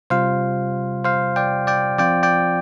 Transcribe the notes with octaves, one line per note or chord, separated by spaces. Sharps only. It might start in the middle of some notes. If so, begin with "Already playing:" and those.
C3 G3 F4 C5 F5
C5 F5
D5 G5
D5 G5
F3 C4 F4 D5 G5
D5 G5